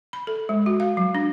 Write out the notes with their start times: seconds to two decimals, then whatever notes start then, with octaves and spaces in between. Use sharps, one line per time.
0.13 B5
0.27 A4
0.49 G#3
0.66 F#4
0.80 F5
0.97 F#3
1.15 D4